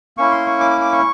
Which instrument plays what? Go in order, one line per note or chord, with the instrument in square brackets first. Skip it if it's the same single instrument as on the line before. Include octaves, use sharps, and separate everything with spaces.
[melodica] A#3 C#4 E4 C#6
C6
C#6
D6
D6
D6
C#6